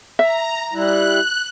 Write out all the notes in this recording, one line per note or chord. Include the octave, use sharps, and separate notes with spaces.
E5 A#5
G3 E4 F#6